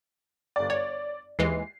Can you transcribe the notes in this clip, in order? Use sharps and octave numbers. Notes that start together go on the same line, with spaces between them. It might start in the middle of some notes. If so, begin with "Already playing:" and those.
G1 D5
C#5 D5
D#2 E3 G#3 C7